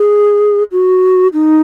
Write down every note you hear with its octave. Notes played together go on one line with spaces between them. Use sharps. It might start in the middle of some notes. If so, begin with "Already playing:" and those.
Already playing: G#4
F#4
D#4